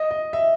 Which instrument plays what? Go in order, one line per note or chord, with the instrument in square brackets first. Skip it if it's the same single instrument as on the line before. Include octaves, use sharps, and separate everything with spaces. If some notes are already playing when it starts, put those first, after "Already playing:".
Already playing: [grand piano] D#5
D#5
E5